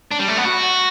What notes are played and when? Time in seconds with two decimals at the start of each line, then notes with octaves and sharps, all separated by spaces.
0.11 D4
0.20 G3
0.28 A3
0.37 B3
0.45 F#4